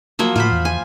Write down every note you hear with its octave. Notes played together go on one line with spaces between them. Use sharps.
F3 F#3 A#3
A2 F4 C5 B5
E2
G#5